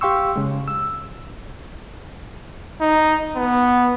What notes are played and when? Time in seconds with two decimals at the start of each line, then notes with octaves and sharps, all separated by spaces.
0.01 G4 F5 G5 C6 C#6 E6
0.36 C#3 G#3
0.68 E6
2.81 D#4
3.36 B3